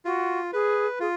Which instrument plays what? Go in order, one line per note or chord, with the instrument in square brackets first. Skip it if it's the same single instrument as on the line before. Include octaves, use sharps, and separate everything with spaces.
[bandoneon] F4 [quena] F#4
[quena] G#4 [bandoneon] B4
[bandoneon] F4 [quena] G#4